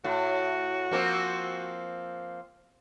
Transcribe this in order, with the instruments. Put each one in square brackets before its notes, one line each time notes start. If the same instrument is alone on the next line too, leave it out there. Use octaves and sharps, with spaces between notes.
[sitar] A2 [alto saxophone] F#4
[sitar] F3 A#3 C4